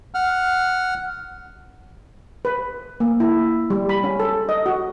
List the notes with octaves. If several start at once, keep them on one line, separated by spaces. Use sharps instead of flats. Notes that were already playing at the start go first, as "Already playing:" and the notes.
F#5 F6
B4
A#3
E4
G3
B5
C#4
A4
D#5
F#4